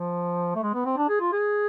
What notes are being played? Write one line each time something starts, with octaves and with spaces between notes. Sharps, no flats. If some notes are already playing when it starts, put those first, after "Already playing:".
Already playing: F3
A3
G#3
B3
C4
D4
G#4
F4
G#4